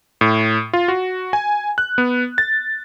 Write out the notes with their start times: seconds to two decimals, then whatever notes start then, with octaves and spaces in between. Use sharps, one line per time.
0.21 A2
0.73 F4
0.88 F#4
1.33 G#5
1.78 F#6
1.98 B3
2.38 A6